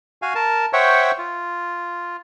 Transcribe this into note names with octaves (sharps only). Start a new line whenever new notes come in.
F#4 F5 G#5
A#4 A5
C5 C#5 E5 F#5 G5 C#6
F4